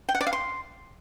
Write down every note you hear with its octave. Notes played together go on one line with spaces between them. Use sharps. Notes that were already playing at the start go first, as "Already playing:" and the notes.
G5
F#5
D5
F5
C6